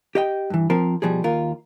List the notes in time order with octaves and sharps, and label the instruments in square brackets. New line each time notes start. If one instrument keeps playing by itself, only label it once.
[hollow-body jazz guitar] G4 D#5 G5
G2 E3
F3 C4 A#4
B2 F3 G3 G#4
D#2 F4 A#4